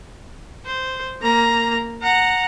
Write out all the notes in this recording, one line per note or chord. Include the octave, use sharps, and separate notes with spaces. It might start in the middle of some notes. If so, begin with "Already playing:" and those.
C5
A#3 A#5
F#5 A#5